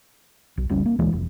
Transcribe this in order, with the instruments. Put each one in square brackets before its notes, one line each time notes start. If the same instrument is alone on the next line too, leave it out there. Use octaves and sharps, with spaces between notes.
[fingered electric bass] B1
F#1 C#2 G3 C#4
A#3
D2 E3 G#3
F1